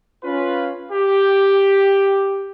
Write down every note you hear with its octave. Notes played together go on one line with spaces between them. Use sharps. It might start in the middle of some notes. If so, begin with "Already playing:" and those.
C#4 F4 B4
G4